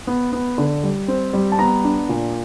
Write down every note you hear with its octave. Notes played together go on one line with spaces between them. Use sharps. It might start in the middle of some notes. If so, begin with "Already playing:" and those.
B3
B3
D3
G3
C4
G3
A5
B3 A#5
D4
A#2